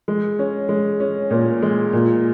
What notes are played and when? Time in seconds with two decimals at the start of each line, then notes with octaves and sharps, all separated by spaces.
0.08 G#3
0.39 C#4
0.69 G#3
1.00 C#4
1.31 A#2
1.62 G#3
1.93 A#2